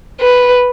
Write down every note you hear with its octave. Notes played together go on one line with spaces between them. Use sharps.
B4